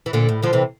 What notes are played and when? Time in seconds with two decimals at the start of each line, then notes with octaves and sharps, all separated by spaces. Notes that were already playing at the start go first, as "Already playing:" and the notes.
0.06 E3
0.13 A#2 D3
0.29 A2
0.43 D3 F3
0.53 C3 E3